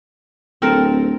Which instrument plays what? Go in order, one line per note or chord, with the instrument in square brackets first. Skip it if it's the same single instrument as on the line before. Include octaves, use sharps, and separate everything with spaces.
[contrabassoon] D1 [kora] C4 A4 A#4